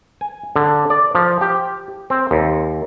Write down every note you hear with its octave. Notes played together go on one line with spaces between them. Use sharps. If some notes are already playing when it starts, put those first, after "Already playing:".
G#5
D3
D5
F3
G4
C4
D#2